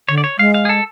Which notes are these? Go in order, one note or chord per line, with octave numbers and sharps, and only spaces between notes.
D3 C#5
D5
C#5
G#3 F5
F5
G#4
A4